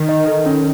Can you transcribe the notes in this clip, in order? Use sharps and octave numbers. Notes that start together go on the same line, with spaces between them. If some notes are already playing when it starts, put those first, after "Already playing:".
Already playing: D#3
D#5
A4
C#4